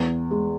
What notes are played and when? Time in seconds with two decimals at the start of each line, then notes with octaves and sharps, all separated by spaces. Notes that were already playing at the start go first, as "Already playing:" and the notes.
Already playing: E2
0.31 G#3